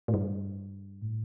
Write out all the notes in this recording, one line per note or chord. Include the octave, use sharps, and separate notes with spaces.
A2
G2
A2